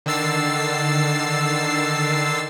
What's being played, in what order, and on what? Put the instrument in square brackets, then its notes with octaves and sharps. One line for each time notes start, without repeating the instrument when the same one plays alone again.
[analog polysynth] D3 D#3 E6 A6 C7